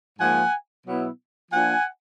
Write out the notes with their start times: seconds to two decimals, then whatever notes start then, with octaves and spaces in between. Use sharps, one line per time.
0.19 G#2 F3 A#3 F#5 G#5
0.86 B2 F#3 B3 E4
1.51 F3 A#3 D4 F4 F#5 G#5